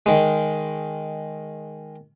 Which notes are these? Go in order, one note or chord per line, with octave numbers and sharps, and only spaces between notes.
D#3 G#3